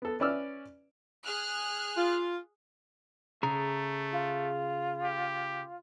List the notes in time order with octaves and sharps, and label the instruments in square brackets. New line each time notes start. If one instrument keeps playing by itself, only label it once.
[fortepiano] B3 A4
C#4 B4 D5 D6 E6 F6
[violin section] G#4 F6 F#6
[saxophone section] F4
[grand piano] C#3 [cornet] A3 [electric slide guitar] G#4 A#5
[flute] F4
[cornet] G4